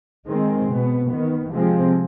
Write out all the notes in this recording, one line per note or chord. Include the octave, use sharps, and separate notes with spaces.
D#3 G#3 C4
B2 B3
D#3 B3
C3 F3 G#3 C4